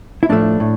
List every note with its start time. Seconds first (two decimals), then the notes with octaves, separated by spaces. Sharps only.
0.23 E4
0.29 A2 F3 A3 D4
0.60 A2